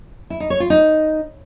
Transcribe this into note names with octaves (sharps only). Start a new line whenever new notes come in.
E4
D#4
C#5
F4
D#4